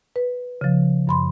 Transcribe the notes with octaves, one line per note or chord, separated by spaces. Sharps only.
B4
C#3 F3
F#2 B5 C6